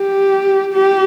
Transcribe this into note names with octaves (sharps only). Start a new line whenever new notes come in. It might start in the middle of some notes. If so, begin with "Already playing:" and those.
Already playing: G4
G4